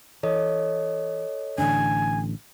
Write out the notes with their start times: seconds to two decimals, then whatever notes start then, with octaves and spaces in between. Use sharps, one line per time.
0.23 E3 A4 C#5 D#5
1.58 A1 D3 D4 G#5